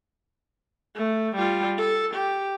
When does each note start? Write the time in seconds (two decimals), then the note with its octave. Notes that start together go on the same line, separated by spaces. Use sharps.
0.96 A3
1.35 G3 F4
1.78 A4
2.14 G4